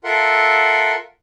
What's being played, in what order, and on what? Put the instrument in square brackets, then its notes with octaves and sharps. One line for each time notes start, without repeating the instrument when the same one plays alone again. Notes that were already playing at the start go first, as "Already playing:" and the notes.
[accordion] F4 A4 A#4 E5 F#5 C6